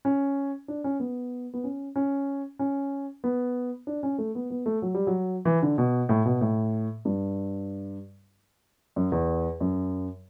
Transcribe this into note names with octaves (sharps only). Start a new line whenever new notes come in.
C#4
D4
C#4
B3
B3
C#4
C#4
C#4
B3
D4
C#4
A3
B3
B3
A3
F#3
G3
F#3
E3
D3
B2
A2
B2
A2
G2
F#2
E2
F#2